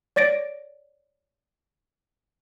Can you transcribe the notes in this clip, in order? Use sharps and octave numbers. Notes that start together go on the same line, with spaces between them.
C#5 D5 A6 A#6 D7